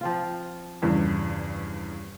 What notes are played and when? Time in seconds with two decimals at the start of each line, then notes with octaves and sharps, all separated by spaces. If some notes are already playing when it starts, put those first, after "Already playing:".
0.01 F3 C4 F4
0.82 E2 G2 C#3